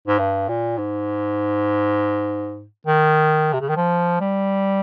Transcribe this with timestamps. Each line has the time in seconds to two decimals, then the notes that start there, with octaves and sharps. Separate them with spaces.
0.08 G#2
0.19 G2
0.49 A#2
0.78 G#2
2.87 D#3
3.53 C3
3.61 C#3
3.69 D#3
3.77 F3
4.21 G3